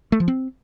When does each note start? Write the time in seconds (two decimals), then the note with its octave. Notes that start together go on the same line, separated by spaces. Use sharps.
0.12 A3
0.20 F3
0.28 C4